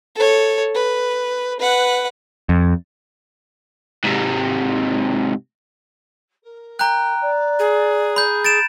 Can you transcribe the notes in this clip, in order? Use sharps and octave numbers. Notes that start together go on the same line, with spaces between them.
A4 C#5
B4
B4 F#5
F2
G#2 C3
A#4
G5 A#5 F#6
D5
G#4
B5 G6
A6 D7 E7